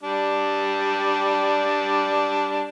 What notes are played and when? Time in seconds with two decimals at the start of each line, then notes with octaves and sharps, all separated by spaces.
0.03 G3 D4